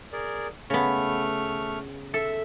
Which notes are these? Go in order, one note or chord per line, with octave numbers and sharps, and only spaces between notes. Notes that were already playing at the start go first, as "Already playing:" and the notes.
G#4 A#4 D5
C#3 A3 B3 C#6 F6
A4 E5